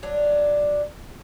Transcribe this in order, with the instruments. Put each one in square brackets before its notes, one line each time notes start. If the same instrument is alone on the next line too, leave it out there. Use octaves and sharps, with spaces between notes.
[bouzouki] F#3 D4